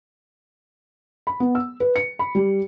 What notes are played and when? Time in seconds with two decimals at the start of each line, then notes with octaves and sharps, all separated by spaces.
1.27 B5
1.40 B3
1.55 E6
1.80 B4
1.96 C#7
2.19 B5
2.35 G3